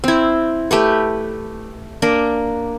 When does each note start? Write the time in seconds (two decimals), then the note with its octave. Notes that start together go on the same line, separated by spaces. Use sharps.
0.04 C4 E4
0.71 A3 G4 B4
2.02 A#3 D4 A#4